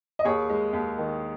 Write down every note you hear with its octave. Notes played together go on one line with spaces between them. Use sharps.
D#5
D#2 G#4 C#5
G#3
D#2
D#3